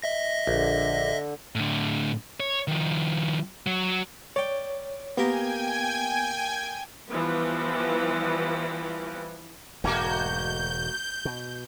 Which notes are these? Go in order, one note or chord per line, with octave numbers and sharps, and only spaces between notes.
D#5 E5 A#6
A#1 D3
A2 D3
C#5
D#3 F3
F#3
C#5 D5 G5
A#3 B3 G4 A#4 G5 G#5 G#6
E3 F3 G3 B3
E1 G#2 D3 A3 A#3 F#4 G6
B2